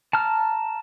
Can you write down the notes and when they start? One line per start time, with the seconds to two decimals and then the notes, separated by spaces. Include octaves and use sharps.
0.13 A5 A#5 F6